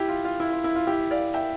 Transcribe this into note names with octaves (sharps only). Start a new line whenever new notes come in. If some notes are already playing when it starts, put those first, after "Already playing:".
Already playing: E4 G4
F4
F4
E4
F4
E4
F4
E4 G4
D5 F5
E5 G5